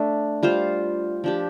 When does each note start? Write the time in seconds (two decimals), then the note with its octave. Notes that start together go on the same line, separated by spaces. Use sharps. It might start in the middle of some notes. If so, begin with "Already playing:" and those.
Already playing: A3 D4
0.43 G3 F4 C5 F5
1.24 F3 D4 G4